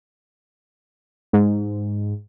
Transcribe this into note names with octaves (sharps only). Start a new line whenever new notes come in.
G#2